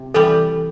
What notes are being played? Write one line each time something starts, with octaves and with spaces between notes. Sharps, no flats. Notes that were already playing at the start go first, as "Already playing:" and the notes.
Already playing: C3
E3 G3 A4